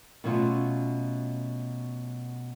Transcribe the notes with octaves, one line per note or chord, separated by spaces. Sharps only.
B2 F#3 A3 C#4 F4